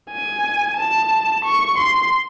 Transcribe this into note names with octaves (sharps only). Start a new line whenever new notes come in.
G#5
A5
C#6
C6